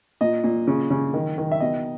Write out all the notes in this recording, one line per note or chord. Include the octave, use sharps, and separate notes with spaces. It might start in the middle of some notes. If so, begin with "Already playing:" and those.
A#2 D#5
A#2
C#3
C#3
D#3
D#3
E5
B2 D#5